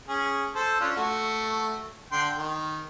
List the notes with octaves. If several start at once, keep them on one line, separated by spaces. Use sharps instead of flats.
C#4 G#4
A4 C5
C#4 D4 F4
A3 F#4
D3 G5 C6
D#3